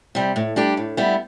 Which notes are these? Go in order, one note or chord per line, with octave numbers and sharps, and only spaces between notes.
C3 G3
A2
G3 D4 G4
A2
G3 B3 E4